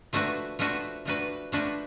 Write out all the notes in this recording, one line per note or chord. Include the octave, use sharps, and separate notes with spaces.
F3 A3 D4 F#4 B4
F3 A3 D4 F#4 B4
F3 A3 D4 F#4 B4
F3 A3 D4 F#4 B4